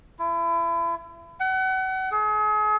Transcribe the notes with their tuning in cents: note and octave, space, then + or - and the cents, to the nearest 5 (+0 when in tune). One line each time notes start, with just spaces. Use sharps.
E4 +35
F#5 +35
G#4 +35